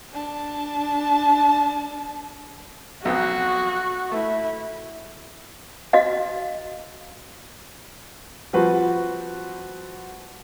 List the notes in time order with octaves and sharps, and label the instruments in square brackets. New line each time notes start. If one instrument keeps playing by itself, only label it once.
[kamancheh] D4 A5
[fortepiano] B1 F2 [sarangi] F#4
[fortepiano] A3 [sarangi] E4
[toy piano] F#4 D#5 F5
[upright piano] F3 G3 C4 F#4 B4 C5